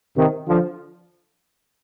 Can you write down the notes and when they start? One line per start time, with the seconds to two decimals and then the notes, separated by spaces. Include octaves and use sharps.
0.16 C3 D#3
0.48 D3 F3